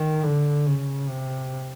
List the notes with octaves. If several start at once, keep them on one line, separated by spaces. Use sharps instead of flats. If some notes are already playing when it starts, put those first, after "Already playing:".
Already playing: D#3
D3
C#3
C3